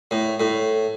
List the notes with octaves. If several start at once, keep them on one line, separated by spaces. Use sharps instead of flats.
A2
A2